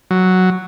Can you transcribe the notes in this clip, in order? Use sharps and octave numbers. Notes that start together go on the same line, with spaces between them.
F#3